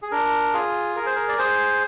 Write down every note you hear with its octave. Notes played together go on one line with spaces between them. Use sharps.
G#4
D4 A#4
F4 G#4
G#4 A#4
C5
A#4
D5
G#4 C5